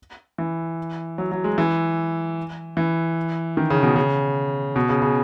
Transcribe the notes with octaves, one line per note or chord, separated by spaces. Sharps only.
E3
F#3
F#3
G#3
E3
E3
D#3
C#3
B2
C#3
B2
C#3
C#3